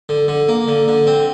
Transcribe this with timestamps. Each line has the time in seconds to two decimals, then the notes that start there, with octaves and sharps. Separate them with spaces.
0.09 D3
0.28 D3
0.49 A#3
0.68 D3
0.88 D3
1.07 C4